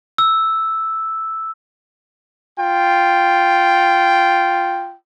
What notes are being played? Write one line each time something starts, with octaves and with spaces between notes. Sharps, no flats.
E6
F4 G5